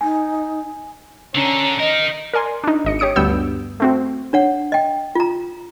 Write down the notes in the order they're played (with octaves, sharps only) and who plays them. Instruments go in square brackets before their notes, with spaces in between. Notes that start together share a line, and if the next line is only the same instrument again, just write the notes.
[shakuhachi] D#4 [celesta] G#5
[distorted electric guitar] D3 A4 [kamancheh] C#4 A#5
[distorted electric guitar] D#4 A#4 [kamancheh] D#5
[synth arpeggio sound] A#4 D5 G#5 C6
D4 D#4
G#1 D#5 C#7
G4 C#5 D#6 C#7 D7
D2 G2 B3 E6 G6
A3 C4 F#4
[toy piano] D4 C#5 F#5
D#5 G5
F4 A#5